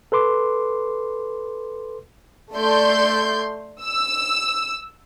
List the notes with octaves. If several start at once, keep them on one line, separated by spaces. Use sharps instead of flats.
A4 B4 C6 D6
A3 A4 D5 C6 G6
E6